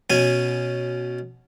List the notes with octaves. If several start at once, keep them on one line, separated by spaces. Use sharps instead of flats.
B2 C#4 G#5